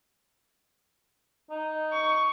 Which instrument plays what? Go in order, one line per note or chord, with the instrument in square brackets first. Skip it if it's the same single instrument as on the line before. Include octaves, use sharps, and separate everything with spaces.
[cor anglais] D#4
[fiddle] C#6